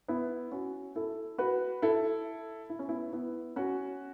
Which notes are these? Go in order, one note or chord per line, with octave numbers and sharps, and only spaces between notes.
B3 E4
C#4 F#4
E4 A4
F#4 B4
E4 A4
E4
C#4
B3 E4
B3 E4
C#4 F#4